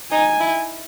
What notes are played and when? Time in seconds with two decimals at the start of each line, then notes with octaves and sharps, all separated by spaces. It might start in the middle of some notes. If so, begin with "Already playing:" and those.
0.12 D#4 G#5
0.40 E4